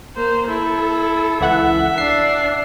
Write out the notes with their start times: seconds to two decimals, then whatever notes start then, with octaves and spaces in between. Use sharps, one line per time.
0.16 A#3 C5
0.48 E4 A4
1.41 C#2 E3 E5 F#5
1.98 D4 C7